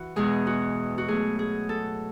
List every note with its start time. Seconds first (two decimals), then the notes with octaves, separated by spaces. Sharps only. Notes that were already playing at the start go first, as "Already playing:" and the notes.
Already playing: E3 E4 F#4
0.16 E2 B2 G#3 G#4
0.47 F#4
0.98 F#4
1.08 B2 F#3 A3 G#4
1.39 G#4
1.69 A4